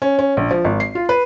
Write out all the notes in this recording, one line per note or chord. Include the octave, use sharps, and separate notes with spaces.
C#4
C#4
A#1
F3
G#1
C7
F4
B4